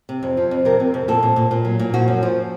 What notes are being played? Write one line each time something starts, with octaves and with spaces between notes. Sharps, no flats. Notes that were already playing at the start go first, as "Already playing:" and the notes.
C3
F2
F3
F2
C3 A#4
C3
F2
A#2 A4
A#2
A#2
A#2
F#3
A#2
F3 F#4
F#2
F3